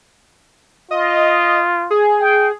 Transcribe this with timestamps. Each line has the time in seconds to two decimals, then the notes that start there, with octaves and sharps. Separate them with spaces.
0.91 F4 D#5
1.90 G#4
2.20 G5